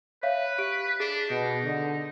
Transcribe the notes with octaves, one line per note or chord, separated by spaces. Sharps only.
B4 C#5 E5 F5
G4 D7
D4 G#4
B2 D#4
D3